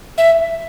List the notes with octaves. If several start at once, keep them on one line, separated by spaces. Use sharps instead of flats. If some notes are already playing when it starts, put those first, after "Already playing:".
E5